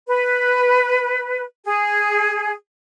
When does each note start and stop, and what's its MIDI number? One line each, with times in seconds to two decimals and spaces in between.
0.07 1.43 71
1.65 2.51 68